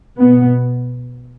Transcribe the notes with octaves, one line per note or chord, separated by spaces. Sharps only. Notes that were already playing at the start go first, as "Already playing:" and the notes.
B2 B3